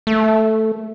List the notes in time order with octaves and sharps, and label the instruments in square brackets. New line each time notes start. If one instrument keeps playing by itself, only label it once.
[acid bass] A3